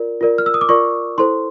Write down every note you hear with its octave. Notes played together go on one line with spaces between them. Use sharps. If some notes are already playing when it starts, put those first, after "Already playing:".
Already playing: F4 A#4 D5
F4 A#4 D5
F6
E6
D#6
D6
F4 A#4 D5 C#6
E4 A4 C5 C6